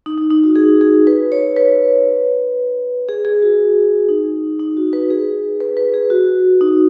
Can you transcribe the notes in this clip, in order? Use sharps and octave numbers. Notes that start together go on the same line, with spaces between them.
D#4
D#4
D#4
F#4
G#4
G#4
B4
C#5
B4
G#4
G#4
F#4
D#4
D#4
F#4
B4
G#4
B4
B4
G#4
F#4
D#4